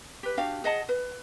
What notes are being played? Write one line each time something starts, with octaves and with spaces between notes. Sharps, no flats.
G4 B4
D4 F#4 G4 F5
G#4 D#5 F#5 A5
B4